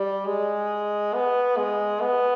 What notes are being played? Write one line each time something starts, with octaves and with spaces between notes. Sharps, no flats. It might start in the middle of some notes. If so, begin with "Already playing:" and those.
Already playing: G3
G#3
B3
G#3
B3